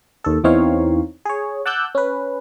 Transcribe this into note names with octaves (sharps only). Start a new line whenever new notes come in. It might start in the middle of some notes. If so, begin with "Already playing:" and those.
D#2 A4
E2 E3 C4 D#4 C#5 F5
G#4 C#5
F#5 A5 D6 E6 F#6 G6
C#4 B4